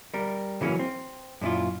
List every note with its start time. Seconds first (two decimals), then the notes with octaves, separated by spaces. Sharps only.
0.14 G3 A#4
0.61 C#3 E3 F#3 A#3 C#4
0.79 C4
1.41 F#2 A#2 D4 E4 F4